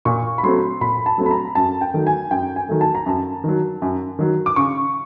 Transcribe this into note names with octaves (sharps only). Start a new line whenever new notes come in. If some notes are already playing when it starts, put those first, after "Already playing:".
A#2 C#6
B5
F#3 A3 C4 C6
A#2 B5
A5
F#3 A3 C4
B5
A#5
F#2 A5
G5
D#3 F#3 A3
G#5
F#2 G5
G#5
D#3 F#3 A3
A5
A#5
F#2 A5
D#3 F#3
F#2
D#3 F#3
D6
C#3 C#6